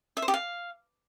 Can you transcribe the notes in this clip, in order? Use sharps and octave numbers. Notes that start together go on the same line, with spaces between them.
E5
C5
G4
F5